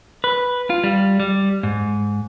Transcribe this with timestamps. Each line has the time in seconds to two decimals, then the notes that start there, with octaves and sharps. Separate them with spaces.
0.24 B4
0.70 F4
0.84 G3
1.20 G3
1.63 G#2